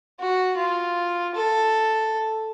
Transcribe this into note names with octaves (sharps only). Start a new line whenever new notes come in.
F#4
F4
A4